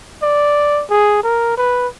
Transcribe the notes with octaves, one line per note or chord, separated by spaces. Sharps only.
D5
G#4
A#4
B4